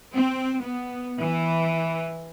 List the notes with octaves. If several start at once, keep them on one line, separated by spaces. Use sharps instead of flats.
C4
B3
E3